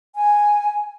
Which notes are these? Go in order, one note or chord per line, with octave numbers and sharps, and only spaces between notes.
G#5